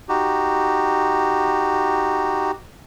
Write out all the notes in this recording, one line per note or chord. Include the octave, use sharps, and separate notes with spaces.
D#4 F#4 G4